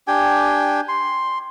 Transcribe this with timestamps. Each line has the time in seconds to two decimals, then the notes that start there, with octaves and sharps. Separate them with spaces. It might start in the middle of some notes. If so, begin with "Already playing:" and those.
0.08 D4 G4 G5 G#5
0.88 C6